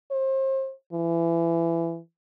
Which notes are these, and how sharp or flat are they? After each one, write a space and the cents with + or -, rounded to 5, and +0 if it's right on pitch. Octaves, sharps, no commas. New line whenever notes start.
C5 +35
E3 +25